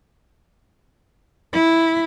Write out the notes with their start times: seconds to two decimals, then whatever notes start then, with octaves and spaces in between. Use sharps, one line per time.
1.53 E4